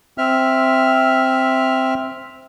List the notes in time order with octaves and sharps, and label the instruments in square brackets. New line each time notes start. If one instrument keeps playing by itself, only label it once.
[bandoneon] C4 E5 F6